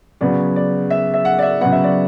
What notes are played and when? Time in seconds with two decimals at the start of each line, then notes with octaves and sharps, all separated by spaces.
0.21 C#3 F#3 B3 D5
0.56 D5
0.90 E5
1.14 E5
1.25 F#5
1.39 D5
1.42 E5
1.61 C#3 F#3 B3 F#5
1.72 E5
1.84 D5